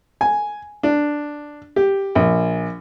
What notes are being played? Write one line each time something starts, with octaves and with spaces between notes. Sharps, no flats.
G#5
D4
G4
A#1